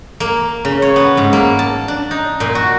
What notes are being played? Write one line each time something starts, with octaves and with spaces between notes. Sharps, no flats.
A#3
C#3
C#5
B3
G#2
A#3
A5
D4
D#4
A#2
F#4